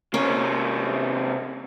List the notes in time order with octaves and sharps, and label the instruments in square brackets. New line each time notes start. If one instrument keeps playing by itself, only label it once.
[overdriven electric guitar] C3 A#3 [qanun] C#4